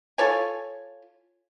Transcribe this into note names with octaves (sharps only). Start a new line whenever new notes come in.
F4 A4 C#5 G#5